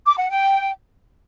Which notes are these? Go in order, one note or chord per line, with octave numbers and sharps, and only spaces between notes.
D6
F#5
G5